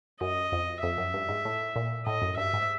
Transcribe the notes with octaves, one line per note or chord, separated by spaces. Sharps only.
F#2 D#5
F2
F2 E5
F#2
G2
G#2
A2
A#2
A2 D#5
F#2
G2 E5
G#2